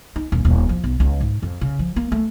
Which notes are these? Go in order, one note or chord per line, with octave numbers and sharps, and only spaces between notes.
D#4
D#1
D#1
F3
B1
C#2
G#2
F2
C#3
F3
A#3
A3